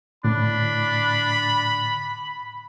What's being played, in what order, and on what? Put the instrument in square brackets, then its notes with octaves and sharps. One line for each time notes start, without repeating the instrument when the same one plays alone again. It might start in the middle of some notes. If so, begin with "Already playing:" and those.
[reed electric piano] A2 D3 [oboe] D4 [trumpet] B5